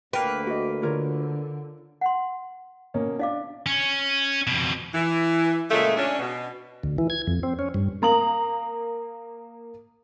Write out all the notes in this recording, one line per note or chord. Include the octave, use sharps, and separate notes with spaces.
D2 A#3 B4 G5
F#4 D#5
D3 F4 A#4 C#5
F#5 C6
B2 A#3 C#4
D4 D#5 F5 D6
C#4
F2 B2
E3
A#2 C#3 G#3 A3
C#4 D4
B2
D2
E3
G#6
F2
C4
C#4
G2
A#3 A#5 D#6 F#7